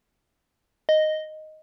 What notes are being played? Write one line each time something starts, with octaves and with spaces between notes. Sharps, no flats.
D#5